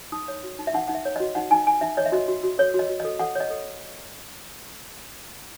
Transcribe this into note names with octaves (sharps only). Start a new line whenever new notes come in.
D#4 D#6
C#5
F#4
D#4
E5
D#4 F#5
D#4 F#5
E5
C#5
F#4 D#5
D#4 F#5
D#4 G#5
D#4 G#5
D#4 E5
C#5 D#5
E5
F#4 D#5
F#4
F#4
A4 C#5
F#4
D#5
F#4
A4 D#5
A4 F#5
C#5
D#5
A4